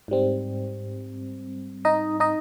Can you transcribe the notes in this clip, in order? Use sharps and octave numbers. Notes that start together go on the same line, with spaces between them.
G#2 G3 C4
D#4 D#5
D#4 D#5